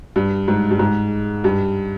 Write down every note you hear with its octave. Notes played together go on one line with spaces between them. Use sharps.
G2
G#2
G2
G#2
G2